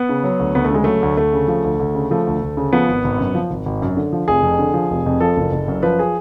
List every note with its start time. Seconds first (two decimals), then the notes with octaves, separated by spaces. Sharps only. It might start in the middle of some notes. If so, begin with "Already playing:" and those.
Already playing: B3
0.09 C#3
0.24 F#3
0.39 D2
0.55 D2 B3
0.65 A3
0.71 C#3 G#3
0.84 F#3 A3
1.02 D2
1.17 D2 A3
1.33 C#3
1.48 F3
1.64 D2
1.80 D2
1.95 C#3
2.11 F3 A3
2.27 D2
2.41 D2
2.57 C#3
2.73 F3 B3
2.88 G#1
3.04 G#1
3.19 F#2
3.35 F3
3.50 G#1
3.66 G#1
3.82 F#2
3.97 D3
4.13 F3
4.28 F1 G#4
4.43 F2
4.59 D3
4.74 F3
4.90 F1
5.06 F2
5.20 F3 A4
5.37 F#1
5.52 F#1
5.68 F#2
5.83 F3 B4
5.99 G#4